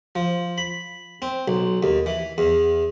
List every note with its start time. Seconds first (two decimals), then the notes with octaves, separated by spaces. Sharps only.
0.15 F3
0.58 B5
1.22 C4
1.48 B1
1.83 D#2
2.06 E3
2.38 E2